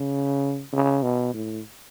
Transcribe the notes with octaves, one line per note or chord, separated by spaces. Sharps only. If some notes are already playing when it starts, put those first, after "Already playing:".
Already playing: C#3
C#3
B2
A2